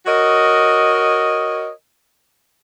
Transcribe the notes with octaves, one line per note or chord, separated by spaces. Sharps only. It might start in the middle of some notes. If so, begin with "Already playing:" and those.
F#4 A#4 C#5 D#5